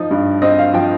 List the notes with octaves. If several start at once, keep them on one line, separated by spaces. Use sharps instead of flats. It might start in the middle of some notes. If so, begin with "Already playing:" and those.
Already playing: F3 D#4
G2
C4 D#5
F5
F3 G5